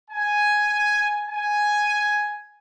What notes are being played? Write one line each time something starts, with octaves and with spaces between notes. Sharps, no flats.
G#5
G#5